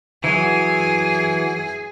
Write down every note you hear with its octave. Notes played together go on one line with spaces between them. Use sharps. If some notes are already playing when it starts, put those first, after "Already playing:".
E3 F#3 G#4